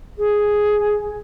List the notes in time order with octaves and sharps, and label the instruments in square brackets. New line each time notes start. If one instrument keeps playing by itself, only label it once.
[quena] G#4